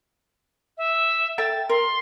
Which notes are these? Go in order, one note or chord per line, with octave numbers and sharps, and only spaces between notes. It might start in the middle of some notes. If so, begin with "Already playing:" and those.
E5
A4 E5 G5 A6
A#4 C6